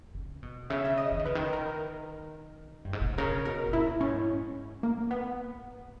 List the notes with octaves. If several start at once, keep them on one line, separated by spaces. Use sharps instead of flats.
C#3
B2
C#3 E5
E5
D#5
E3
D#3
C#3 B4
D#3
A#4
G2
G#2
A#2
B2
C#3 A#4
B2 A#4
B2
A#2 E4
G#2 C#4
A#3
B3